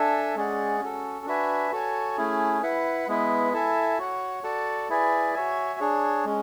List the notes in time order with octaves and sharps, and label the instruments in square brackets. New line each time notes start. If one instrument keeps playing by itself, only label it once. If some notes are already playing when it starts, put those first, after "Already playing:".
Already playing: [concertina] D4 A4 E5 G#5
G#3 C#4 G#4 D5 F#5
C#4 F#4 A4
D4 F#4 B4 E5 G#5
F#4 A4 C#5 G#5
A3 C#4 E4 G#4
E4 B4 F#5
G#3 B3 E4 B4
E4 A4 E5 G#5
F#4 C#5 F#5
F#4 A4 D5 F#5
E4 G#4 B4 D5 G#5
F#4 C#5 E5 G#5
D4 G#4 C#5
G#3 C#4